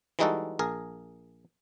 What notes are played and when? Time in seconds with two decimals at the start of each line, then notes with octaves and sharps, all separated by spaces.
0.19 E3 G3 G#3 D#4 F#4 A4
0.59 A#1 G#4 A#4